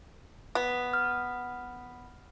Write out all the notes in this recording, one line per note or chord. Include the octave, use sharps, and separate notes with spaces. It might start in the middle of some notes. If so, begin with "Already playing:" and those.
B3
F6